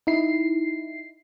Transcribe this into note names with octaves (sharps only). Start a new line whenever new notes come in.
D#4 E4 C7